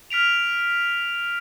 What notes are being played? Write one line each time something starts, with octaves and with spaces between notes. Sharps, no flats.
F6 B6 D7 F7